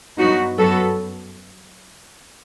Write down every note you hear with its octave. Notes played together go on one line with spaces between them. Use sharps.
G2 F#3 B3 D#4 F#4
F#2 F#3 B3 F#4 A4